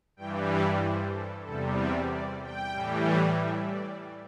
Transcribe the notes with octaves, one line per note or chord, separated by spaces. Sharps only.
G2 E3 G3 G5
D5
C5
A4
E2 C3 G3 A4
E5
D5
G5
A2 E3 G3
E5
D5